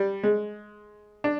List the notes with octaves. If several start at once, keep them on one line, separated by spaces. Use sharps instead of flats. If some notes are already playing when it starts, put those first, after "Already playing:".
Already playing: G3
G#3
D4